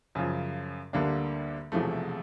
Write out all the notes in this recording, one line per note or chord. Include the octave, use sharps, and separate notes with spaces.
F#2 C#3 F3
D2 D3 G3 A#3 D4
E1 E2 C3 F3 A3